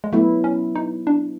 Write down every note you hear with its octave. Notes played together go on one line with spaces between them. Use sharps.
G#3
F#3 A3 B3 E4
C#4
D#4
D4